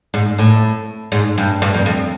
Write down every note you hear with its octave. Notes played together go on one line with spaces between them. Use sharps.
G#2
A2
G#2
G2
G2
F2
F2